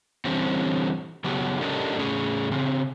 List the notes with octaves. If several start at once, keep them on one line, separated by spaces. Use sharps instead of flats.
D3 E3 G3 C4 C#4
C#3 F#3 B3 G4
C#4 D4 G4 A4 A#4 D#5
A2 C#4 E4 G#4
C#3 C4